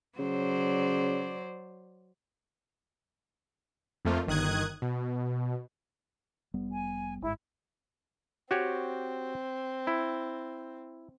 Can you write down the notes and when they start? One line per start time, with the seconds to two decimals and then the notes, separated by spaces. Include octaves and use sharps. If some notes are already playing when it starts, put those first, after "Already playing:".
0.19 C#3 F#3 C5 D5
4.05 F2 F3 A3 A#3 F4
4.27 G1 D#3 D#6 F#6 G#6
4.82 B2
6.54 F1 G3 B3
6.72 G#5
7.22 G1 G#2 E4
8.51 C4 F#4 G4 C#5
9.87 E4